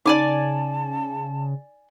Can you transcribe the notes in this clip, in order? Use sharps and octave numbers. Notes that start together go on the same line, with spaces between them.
C#3 D#4 D5 G#5 A5 D6